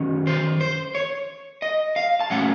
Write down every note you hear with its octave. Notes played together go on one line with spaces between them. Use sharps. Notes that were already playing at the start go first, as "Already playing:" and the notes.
Already playing: F#2 D#3 F#3 C#4
C5
C5
C#5
D#5
F5
A5
A#2 F#3 A3 C#4 F#5